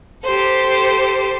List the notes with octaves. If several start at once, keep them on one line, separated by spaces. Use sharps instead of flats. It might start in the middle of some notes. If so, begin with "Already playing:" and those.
G4 A4 C5